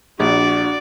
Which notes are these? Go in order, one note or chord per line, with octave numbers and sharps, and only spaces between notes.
A#1 D4 F#4 D5